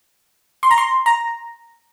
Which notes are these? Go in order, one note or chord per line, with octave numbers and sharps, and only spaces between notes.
C6
A#5
C6
A#5